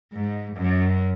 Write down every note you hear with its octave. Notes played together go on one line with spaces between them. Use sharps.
G#2
F#2